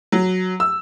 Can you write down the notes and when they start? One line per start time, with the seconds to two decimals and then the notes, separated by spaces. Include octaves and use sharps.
0.12 F#3
0.60 E6